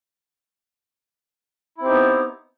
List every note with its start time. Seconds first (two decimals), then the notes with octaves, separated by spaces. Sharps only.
1.77 E4
1.81 C4
1.85 G4
1.88 D#4
1.92 B3